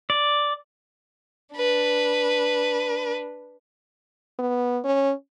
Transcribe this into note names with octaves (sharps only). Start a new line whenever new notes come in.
D5
D4 B4
B3
C#4